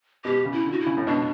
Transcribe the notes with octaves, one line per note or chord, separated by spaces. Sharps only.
B2 G4
C#3
E4
D3
F#4
E4
C#3
A2
B2 D4